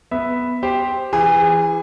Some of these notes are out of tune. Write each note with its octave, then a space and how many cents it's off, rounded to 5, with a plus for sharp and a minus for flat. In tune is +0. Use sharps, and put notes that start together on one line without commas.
B3 +0 E5 +0
G4 +0 C5 +0
E3 +20 G#4 -25